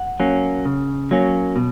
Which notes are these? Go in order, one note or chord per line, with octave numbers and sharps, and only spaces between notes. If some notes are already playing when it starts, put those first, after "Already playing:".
Already playing: F#5
F#3 A#3 C#4
C#3
F#3 A#3 C#4
B2